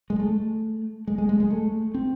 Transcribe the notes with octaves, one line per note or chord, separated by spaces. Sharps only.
G#3
A3
G#3
G#3
G#3
G#3
A3
C4